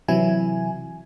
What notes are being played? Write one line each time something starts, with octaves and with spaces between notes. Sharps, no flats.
C3 E3 F#3 E4 G#5